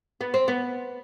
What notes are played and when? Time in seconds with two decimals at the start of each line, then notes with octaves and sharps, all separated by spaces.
0.21 B3
0.34 C4
0.48 B3